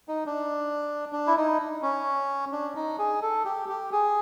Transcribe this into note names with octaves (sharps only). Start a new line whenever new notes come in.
D#4
D4
D4
E4
D#4
C#4
D4
D#4
G#4
A4
G4
G4
G#4